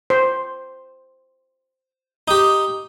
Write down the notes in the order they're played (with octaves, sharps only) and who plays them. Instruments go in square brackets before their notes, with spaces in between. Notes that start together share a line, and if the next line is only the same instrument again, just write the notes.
[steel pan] C5
[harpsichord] D#4 G4